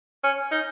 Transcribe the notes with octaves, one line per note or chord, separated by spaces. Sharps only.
C#4
D#4